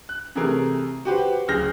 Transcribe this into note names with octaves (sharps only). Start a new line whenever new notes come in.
F#6
C3 E3 A3 G#4 A#4
F#4 G4 B4 C5
D1 C#3 G#4 F6 G6 A#6